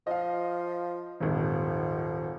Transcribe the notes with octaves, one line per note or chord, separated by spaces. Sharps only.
F3 D#5 F5
D#1 G#1 F3